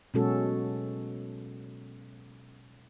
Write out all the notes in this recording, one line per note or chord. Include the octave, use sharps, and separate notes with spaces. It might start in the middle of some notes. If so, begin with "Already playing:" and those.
B2 F#3 G#3 C#4 F#4 A4